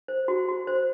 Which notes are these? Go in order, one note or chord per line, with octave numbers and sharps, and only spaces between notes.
C5
F#4
F#4
C5